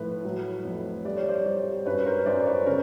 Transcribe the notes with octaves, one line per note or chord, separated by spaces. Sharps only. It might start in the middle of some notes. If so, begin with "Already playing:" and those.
Already playing: A2 F3 B4
F#3
F2
G3 D5
C#5
C5 D5
G3
F#2 B4 C#5
A#4 C5
F#2 C5 D5
B4 C#5
C#3 A#4 C5